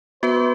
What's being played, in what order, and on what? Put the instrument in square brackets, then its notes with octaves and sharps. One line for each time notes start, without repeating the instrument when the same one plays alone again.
[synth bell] B3 F#4 B4 [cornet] C5